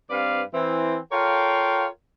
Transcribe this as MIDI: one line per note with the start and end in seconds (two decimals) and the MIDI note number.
0.10 0.42 43
0.10 0.42 60
0.10 0.42 71
0.10 0.42 74
0.10 0.42 77
0.54 0.97 52
0.54 0.97 60
1.12 1.86 65
1.12 1.86 69
1.12 1.86 70
1.12 1.86 73
1.12 1.86 77
1.12 1.86 79